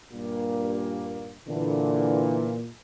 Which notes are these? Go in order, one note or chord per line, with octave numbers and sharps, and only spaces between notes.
G2 A#2 A#3
A#2 D3 E3